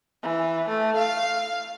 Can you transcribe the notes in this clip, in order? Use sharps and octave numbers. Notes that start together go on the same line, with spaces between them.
E3
A3
F5